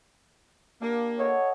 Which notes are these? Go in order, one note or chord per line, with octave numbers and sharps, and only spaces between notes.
A#3 D4 G4
A4 C#5 D#5 F#5